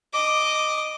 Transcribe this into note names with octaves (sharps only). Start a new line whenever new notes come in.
D#5 D6